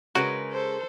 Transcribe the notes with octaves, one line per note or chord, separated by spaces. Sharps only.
C#3 G#3 F#4 A#4 B4
A4 C5